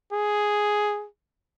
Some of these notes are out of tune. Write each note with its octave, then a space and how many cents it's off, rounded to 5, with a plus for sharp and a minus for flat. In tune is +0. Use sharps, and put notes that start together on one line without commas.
G#4 +5